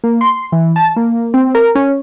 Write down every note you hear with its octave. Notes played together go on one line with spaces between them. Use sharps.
A#3
C6
E3
A5
A#3
C4
A#4
C#4